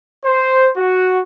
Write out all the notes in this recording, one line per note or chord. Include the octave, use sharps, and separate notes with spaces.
C5
F#4